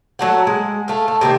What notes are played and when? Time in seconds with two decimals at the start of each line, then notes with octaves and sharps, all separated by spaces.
0.19 F#3 A3 F#5
0.47 G#3
0.88 A3 F5
1.08 A3
1.21 C3 D#3 A3 A#3